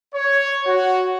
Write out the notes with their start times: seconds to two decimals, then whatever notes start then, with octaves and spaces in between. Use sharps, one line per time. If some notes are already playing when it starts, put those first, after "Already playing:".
0.15 C#5
0.67 F#4